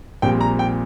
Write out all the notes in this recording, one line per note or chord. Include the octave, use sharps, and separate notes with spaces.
A#1 A#2 G3 C4 G5
A#5
G5